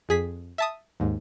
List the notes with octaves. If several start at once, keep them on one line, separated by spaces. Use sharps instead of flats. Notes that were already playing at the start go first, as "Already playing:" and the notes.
F2 G#4 B6
E5 A5 D#6
D#2 G#2